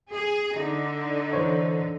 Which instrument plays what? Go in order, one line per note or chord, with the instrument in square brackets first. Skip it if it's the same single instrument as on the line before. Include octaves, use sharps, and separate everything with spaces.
[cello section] G#4
D3 D#4
[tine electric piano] E3 C5 C#5